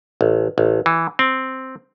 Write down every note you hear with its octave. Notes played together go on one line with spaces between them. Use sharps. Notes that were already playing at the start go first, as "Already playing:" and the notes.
A1
A1
E3
C4